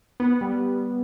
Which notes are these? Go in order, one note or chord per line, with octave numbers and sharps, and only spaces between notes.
B3
G3